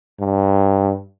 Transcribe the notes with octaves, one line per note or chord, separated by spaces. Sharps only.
G2